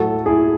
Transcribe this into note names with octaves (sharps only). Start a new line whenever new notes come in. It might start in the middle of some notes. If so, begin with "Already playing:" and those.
Already playing: A2 F#3 A3 F#4 A4
E4 G#4